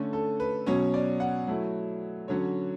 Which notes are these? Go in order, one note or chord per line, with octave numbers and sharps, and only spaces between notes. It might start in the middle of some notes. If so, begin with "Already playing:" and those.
Already playing: D3 A3 C#4
A4
B4
B2 F#3 C#4 C#5
D5
F#5
F#3 A3 E4
D3 F#3 C#4 C#5